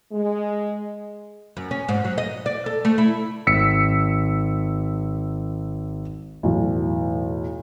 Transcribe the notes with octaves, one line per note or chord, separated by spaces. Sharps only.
G#3
F#2
C#4
G#2
F#3
D#5
D5
A4
A3
E4
G#1 E6 B6 C#7
B1 E2 A2